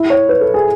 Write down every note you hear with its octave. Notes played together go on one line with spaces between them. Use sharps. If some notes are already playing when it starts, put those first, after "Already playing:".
Already playing: E4
C#5
B4
A4
G#4